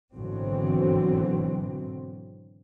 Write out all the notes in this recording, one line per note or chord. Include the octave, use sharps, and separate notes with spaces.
G#1 B2 D3 E3 F#3 C4